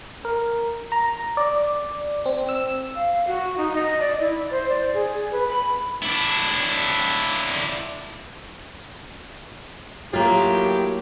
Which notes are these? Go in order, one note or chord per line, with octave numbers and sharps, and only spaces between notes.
A#4
A#5
D5
C4
E6
F5
F#4
D#4
D#5
D5
E4
C5
D5
G#4
B4
B5
D4 E4
A2 F#3 A#3 F4 G4